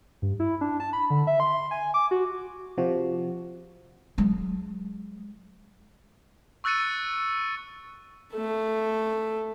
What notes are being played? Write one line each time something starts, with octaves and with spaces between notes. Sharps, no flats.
G2
E4
D4
A5
B5
D3
E5
C6
G#5
D6
F#4
C3 F3 F#4
F#3 G#3
C#6 E6 F#6 A6 C#7 D#7
A3 A4